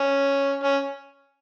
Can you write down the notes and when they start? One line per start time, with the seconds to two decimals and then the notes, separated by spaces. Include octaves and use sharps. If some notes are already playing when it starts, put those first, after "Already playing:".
Already playing: C#4
0.63 C#4